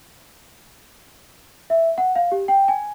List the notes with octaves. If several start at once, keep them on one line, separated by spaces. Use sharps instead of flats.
E5
F#5
F5
G4
G5
G#5